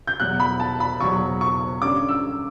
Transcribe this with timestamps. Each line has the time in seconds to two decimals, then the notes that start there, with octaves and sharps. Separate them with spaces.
0.07 G6
0.19 E2 B2 F#3 F#6
0.40 B5
0.60 A5
0.80 B5
1.00 E2 B2 F#3 C#6
1.41 C#6
1.82 G2 D3 G3 C#4 D6
2.09 E6